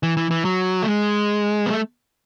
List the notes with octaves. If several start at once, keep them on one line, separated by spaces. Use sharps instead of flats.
E3
E3
E3
F#3
A3
G#3
B3
A3